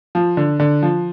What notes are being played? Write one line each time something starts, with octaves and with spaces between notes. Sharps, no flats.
F3
D3
D3
F3